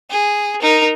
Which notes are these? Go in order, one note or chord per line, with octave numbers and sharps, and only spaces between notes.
G#4
D#4 A#4